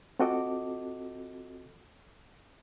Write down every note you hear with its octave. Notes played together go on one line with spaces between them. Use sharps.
C4 F4 F#4 A4 D#5 D6